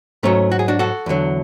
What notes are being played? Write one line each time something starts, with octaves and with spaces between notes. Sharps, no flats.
G#2 F#3 A3 C#4
F#4
G#4
D4 F#4
F#4 A4
E2 D3 F#3